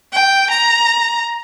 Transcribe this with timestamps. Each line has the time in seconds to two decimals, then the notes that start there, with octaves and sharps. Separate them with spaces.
0.13 G5
0.50 A#5